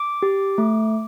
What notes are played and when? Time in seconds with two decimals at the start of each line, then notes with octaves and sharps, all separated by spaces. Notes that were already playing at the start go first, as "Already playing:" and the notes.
Already playing: D6
0.22 G4
0.58 A3